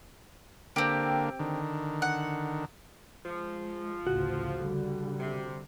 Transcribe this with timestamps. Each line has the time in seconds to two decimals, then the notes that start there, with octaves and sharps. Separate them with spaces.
0.76 D3 A#3 C4 G4
1.39 D3 D#3
2.02 F#5
3.25 F3 G#3
4.07 A1 D2 C#3 F#4
4.56 D3 G3
5.19 C3